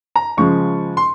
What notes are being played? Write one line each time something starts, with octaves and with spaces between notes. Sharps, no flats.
A#5
C#3 F3 G#3 C#6
C6